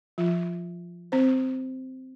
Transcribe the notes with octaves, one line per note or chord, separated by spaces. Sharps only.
F3 F4
C4 C5